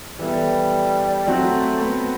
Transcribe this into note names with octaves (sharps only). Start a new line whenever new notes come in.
E3 G3 B3 E4 A4
F#3 A3 C4 F#4
B3